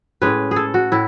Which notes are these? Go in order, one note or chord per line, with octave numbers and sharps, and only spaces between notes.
A2 G#3 C#4 B4
G#4
A4
F#4
A2 E4